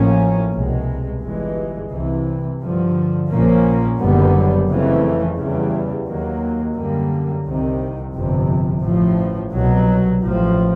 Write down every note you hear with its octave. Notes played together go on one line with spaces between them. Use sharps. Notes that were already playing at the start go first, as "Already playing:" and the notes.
Already playing: A1 A2 F3 A#3 C#4
C2 B2 G#3
G1 G2 E3 G#3
C2 C3 E3
G2 D3 F3
A#1 A#2 F3 A#3 C#4
F#1 F#2 D3 G3 B3
F2 C#3 E3 A3
E2 C#3 E3 G3
D#2 D#3 F#3 A#3
F#2 D3 G3 A#3
C2 C3 D#3
G1 F2 C3
A1 A2 F3
C2 B2 F#3
A1 A2 F3